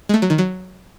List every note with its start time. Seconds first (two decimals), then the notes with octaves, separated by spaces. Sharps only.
0.09 G#3
0.14 A3
0.22 F#3
0.30 D#3
0.38 F#3